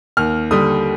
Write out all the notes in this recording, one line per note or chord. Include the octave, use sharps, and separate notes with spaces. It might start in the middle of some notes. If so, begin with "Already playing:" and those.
D#2 F6
D3 G3 D#6